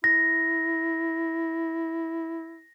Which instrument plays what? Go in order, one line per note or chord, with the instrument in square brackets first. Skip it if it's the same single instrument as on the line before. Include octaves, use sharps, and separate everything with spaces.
[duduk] E4 [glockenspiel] A#6